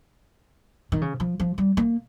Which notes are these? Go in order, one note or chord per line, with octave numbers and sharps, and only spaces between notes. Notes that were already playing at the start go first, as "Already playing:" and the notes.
D#3
C#3
F3
F3
G3
A#3